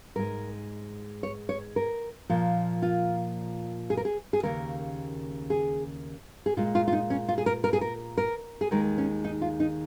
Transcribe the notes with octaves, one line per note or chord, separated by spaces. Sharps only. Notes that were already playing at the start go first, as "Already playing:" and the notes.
G#2 G#3 A#4
C#5
C#5
A#4
A#2 F3 A#3
F4
G#4
A#4
G#4
G#4
D#2 C#3 A#3 A#4
G#4
G#4
A#2 G#3 F4
F4
F4
D#4
C#4
F4
G#4
A#4
A#4
G#4
A#4
A#4
G#4
D#2 D#3 G#3 A#4
C#4
D#4
F4
D#4